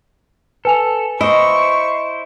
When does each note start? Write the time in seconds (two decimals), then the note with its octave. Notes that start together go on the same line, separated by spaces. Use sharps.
0.65 A4 B4 G#5 F7
1.21 E4 C5 D#5 C#6